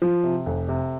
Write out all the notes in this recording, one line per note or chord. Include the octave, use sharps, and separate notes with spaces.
F3
C3
F1
C3